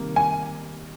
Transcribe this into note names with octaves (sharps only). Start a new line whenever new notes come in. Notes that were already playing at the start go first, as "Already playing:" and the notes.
Already playing: C3 D#3 G3 A#3
G#5